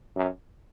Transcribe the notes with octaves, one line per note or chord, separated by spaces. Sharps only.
F#2